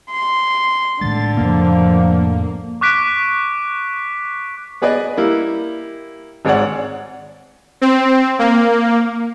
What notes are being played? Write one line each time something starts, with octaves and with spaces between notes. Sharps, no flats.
C6
A2 D3 D#3 G#3 A6
F2 A2 C#3 F3 A#3
C#6 D6 F#6 B6 D7
B3 G#4 B4 D5 D#5
G3 A#3 E4
G#1 G#2 C#5 D5 F#5
C4
A#3